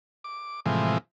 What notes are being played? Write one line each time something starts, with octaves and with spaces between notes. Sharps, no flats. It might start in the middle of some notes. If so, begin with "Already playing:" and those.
D6
A2 C3 E3 F3 G#3